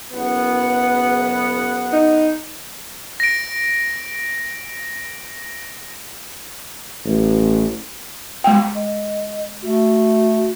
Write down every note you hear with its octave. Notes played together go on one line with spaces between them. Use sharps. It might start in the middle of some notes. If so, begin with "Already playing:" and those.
F#1 B3 F#5
D#4
A#6 D7
A1
G#3 G5
D#5
A3 F#4